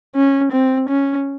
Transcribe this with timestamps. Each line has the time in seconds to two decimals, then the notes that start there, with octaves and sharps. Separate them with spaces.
0.16 C#4
0.52 C4
0.89 C#4